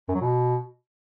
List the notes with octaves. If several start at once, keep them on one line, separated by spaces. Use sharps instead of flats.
F#2
F#3
B2